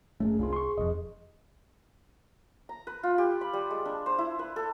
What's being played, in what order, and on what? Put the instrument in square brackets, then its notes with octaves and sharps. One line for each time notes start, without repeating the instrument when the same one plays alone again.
[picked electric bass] F#1 A3 [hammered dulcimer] G#3 A#4 [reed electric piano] C#4 G#4
[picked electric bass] C2 [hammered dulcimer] G#2 B5 D6 [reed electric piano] D4 F4 C6
[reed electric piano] C6 C#6
[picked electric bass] E1 F2 [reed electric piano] D#5
[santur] A#5
B4
F4
G4
B5
G3
G#3
D4
C5
E4
B4
A4